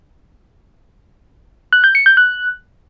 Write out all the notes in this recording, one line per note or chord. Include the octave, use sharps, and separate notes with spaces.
F#6
G6
C#7
G6
F#6